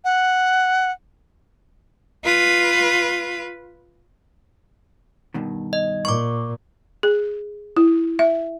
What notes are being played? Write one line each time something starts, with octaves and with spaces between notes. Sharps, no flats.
F#5
F4 B4
G2 B2 D#3
D#5
A#2 C#6 D6
G#4
E4
E5